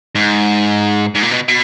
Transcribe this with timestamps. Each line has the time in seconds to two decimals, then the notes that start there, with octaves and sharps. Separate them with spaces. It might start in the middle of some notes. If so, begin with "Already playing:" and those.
0.15 G#2
1.15 G#2
1.22 A#2
1.31 B2
1.48 B2